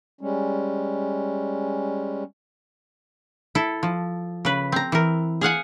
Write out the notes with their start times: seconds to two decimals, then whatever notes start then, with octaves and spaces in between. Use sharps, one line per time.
0.21 G3 G#3 C#4
3.55 E4 A4
3.83 F3
4.45 C#3 B4
4.72 C4 A#5
4.92 E3 A#4
5.41 G#4 F5 F#5 G#5